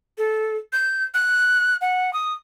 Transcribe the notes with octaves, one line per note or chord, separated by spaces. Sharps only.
A4
G6
F#6
F#5
D#6